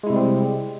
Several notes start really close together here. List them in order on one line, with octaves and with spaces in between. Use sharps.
G#3 E4 C3 G3 C4